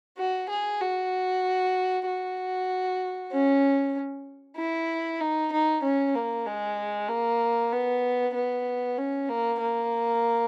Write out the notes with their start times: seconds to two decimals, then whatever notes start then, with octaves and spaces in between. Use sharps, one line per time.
0.18 F#4
0.49 G#4
0.80 F#4
2.06 F#4
3.32 C#4
4.58 E4
5.21 D#4
5.52 D#4
5.83 C#4
6.15 A#3
6.46 G#3
7.09 A#3
7.72 B3
8.35 B3
8.98 C#4
9.29 A#3
9.60 A#3